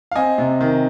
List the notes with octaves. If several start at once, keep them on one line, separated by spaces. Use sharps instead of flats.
F5
C4 D#5 G#5
C3
D#3